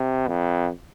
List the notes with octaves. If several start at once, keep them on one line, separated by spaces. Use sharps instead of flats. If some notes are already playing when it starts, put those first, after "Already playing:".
Already playing: C3
F2